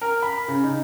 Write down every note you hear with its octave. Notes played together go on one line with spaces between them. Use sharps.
A#4
B5
C#3
D#4